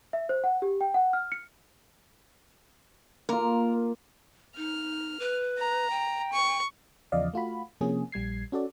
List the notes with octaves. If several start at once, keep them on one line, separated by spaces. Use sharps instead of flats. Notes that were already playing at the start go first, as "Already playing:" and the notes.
E5
C5
F#5
G4
G5
F#5
F6
C#7
A#3 F4 A#4
D#4 F6
B4
A#5
G5
C#6
E2 C#3 F3 D5 D#5 F5
A3 F4 F#4 B5
C3 F3 A#3 C#4 G#4
A#1 G3 G#6 C7
C#4 F#4 A4 D5